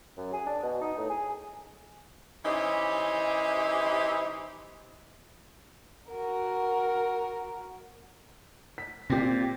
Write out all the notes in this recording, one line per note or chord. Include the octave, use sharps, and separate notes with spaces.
F#2
G#4
D4
B2
D#4
A2
G#4
E3 C#4 D#4 G4 C5 E5
F#4 A#4
B6
A#2 C4 G4